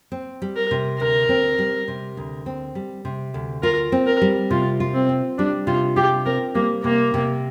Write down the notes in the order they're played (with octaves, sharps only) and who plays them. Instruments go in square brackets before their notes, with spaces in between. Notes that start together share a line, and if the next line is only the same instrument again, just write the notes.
[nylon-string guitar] C4
G3
[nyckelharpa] A#4
[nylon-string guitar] C3
[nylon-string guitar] D2 [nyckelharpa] A#4
[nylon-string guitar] C4
G3
C3
D2
C4
G3
C3
D2
[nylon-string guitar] F4 [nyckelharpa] A#4
[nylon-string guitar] C4
[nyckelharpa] A#4
[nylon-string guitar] G3
[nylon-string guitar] C3 [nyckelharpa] F4
[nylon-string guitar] F4
[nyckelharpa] C4
[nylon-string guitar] C4
[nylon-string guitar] G3 [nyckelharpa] D4
[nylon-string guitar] C3 [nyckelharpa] F4
[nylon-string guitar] F4 [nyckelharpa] G4
[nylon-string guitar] C4 [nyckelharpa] A#4
[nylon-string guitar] G3 [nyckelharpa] A#3
[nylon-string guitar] C3 [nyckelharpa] A#3
[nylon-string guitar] C3